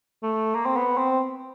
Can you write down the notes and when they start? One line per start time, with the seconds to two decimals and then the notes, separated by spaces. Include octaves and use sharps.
0.23 A3
0.55 A#3
0.66 C4
0.76 B3
0.98 C4